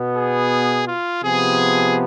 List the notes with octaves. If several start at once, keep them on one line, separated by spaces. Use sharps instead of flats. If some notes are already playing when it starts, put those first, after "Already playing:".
Already playing: B2 B3
G#4
F4
C3 F3 B3 G#4